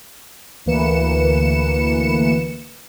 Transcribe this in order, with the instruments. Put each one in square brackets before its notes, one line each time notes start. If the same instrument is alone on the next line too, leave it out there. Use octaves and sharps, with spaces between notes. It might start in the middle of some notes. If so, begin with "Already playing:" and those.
[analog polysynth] D2 E3 A#3 B4 C#7 E7